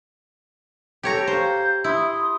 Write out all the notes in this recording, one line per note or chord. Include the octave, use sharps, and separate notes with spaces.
G4 A4 C#5 A#5
C5 F5 G6
E4 C6 D#6